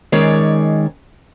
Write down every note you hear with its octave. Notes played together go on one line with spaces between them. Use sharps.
D#3 G#3 C#4 C#5 D5